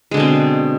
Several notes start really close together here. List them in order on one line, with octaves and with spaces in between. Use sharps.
G#3 D3 B2 C4